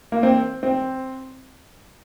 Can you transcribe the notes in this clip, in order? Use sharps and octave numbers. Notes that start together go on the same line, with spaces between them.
A#3
C4
C4